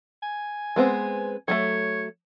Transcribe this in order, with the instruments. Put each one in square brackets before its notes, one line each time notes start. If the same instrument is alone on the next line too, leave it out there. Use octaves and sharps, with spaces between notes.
[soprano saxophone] G#5
[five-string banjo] G#3 B3 C4
[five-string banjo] F#3 G3 A3 [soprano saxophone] C#5